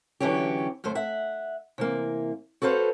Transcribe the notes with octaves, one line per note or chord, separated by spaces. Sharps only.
D3 E3 F#3 C#4 G4
F#2 D3 A3 C5
E5 F#5
C3 E3 A#3
F#4 A4 B4 C5 F5